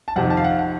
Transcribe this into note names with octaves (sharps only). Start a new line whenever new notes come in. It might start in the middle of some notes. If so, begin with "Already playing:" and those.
A5
F2 C3 D#3 F#5
A5
F5
F#5
F#5